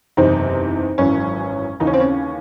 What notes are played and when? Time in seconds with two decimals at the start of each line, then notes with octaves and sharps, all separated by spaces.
0.17 F#1 E2 C3 E3 C4 D#4
0.98 G#1 F#2 E3 C#4
1.80 D#2 C#3 E3 D#4
1.87 C#4
1.93 C4
2.00 C#4